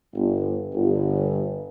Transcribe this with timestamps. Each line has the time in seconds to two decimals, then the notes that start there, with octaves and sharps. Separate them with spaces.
0.14 G1
0.74 G1